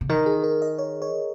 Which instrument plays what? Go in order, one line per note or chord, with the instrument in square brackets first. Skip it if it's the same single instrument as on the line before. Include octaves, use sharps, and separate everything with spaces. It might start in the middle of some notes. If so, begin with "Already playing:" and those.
[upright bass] C#3
[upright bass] D#3 [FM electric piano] A#4
[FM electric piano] G#4
A#4
D#5
C#5
C#5